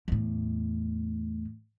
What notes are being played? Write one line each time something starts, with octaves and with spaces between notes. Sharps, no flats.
E2 A2